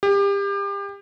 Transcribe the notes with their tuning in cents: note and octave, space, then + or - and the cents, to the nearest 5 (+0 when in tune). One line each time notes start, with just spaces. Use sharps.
G4 +30